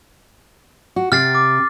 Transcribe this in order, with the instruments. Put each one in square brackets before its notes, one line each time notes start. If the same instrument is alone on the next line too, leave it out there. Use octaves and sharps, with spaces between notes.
[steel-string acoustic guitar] F#4
[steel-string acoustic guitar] C3 G4 [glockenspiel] F6 A6 C7
[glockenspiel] D6